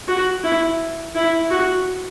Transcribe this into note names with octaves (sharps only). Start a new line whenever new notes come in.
F#4
E4
E4
F#4